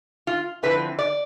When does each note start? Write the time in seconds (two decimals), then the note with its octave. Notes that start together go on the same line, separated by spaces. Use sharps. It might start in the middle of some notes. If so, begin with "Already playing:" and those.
0.27 F4
0.63 D3 F3 C4 E4 B4
0.99 D5